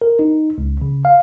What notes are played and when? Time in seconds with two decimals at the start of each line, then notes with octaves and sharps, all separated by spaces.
0.01 A#4
0.19 D#4
0.58 C#2
0.82 C#3
1.05 F5